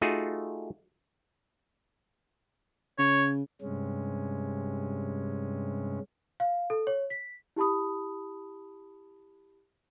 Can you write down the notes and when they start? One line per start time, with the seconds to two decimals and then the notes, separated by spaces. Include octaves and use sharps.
0.01 A3 D#4 F4 F#4 G#4
2.98 C#3 C#5
3.61 G2 C3 G#3 C#4
6.40 F5
6.70 A4
6.87 C#5
7.10 B6
7.56 E4 G4 A5 B5 D#6